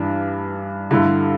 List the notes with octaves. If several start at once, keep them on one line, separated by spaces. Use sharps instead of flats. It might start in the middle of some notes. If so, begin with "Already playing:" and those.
Already playing: G2 E3 D4
G2 D3 E4